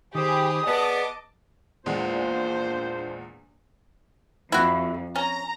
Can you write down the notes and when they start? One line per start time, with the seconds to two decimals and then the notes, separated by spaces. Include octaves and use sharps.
0.15 D#3 G4 G#4 C5 B5 D#6
0.67 B3 G#4 D5 D#5 A5 D6
1.86 A#1 E2 A#2 G#3 D4 C5
4.52 F2 E4 F#4
5.16 C#4 A#5